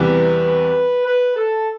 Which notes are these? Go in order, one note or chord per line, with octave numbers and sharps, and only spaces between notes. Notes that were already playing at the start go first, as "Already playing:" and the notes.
Already playing: E2 C3 E3 G3 B4
B4
A4